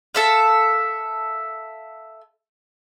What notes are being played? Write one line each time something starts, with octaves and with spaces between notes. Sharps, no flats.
A4 E5 F5